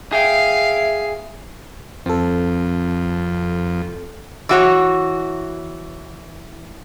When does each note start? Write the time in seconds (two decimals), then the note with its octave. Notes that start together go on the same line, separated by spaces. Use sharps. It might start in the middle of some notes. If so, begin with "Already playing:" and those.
0.13 G#4 E5 F5 G5
2.06 F2 C4 A4
4.49 E3 F#4 C#5